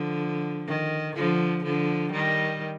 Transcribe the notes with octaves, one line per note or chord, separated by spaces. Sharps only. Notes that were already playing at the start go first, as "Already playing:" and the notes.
Already playing: D3 F3
D#3
D3 F3
D3 F3
D#3 G3